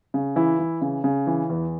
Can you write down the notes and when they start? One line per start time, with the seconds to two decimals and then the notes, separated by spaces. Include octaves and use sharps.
0.14 C#3
0.36 E3 E4
0.59 E3
0.81 C#3
1.04 C#3
1.27 E3
1.50 E2